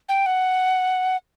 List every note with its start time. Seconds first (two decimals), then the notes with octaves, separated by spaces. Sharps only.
0.09 G5
0.26 F#5